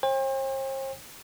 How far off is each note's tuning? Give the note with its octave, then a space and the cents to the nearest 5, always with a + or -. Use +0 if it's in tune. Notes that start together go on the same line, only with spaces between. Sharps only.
C5 +45 G5 +40